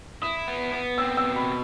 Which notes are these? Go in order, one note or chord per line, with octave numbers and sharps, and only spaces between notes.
E4 D#6
B3
B3
C4 E6
E6
B2
B5